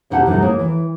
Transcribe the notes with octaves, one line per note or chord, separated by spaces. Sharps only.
E2 B2 D#4 G4 F#5 A5
D2 G2 C3 F#3 D#4 F#4
A#3 G#4 C#5
E3